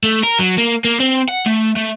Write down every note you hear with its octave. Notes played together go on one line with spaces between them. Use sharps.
A3
A#4
F#3
A#3
A#3
C4
F#5
A3
A3